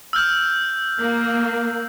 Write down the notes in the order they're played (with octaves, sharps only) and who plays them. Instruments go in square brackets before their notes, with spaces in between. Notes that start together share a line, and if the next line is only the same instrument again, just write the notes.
[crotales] E6 F6 G6
[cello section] A#3